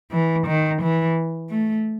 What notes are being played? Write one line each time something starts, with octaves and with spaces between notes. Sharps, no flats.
E3
D#3
E3
A3